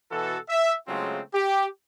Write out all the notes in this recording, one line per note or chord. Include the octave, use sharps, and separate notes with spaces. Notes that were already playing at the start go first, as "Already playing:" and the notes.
B2 E3 F#4 A4
E5
C#3 F#3 G#3 A3 C4 F4
G4